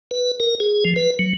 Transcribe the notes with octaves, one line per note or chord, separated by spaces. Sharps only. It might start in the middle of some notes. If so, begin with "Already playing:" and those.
B4
A#4
G#4
F3
B4
F#3